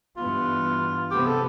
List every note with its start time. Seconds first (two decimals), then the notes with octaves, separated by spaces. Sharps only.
0.16 G2 E3 B3 F4
1.11 C3 F3 B3 G4
1.26 A4